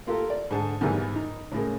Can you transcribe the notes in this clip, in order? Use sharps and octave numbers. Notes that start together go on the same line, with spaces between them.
A#3 F4 G4 A4 A#4
D5
G#2 D3 G#4 A5
E2 G#2 D#3 E3 G3
D#4
A2 C#3 G#3 A#3